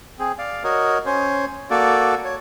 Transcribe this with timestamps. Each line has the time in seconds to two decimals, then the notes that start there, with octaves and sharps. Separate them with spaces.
0.19 C4 G#4
0.38 D5 F5
0.64 F#4 A#4 C#5 D#5
1.06 C#4 C5 C#5
1.70 A#3 F#4 A4 D5
2.25 C#5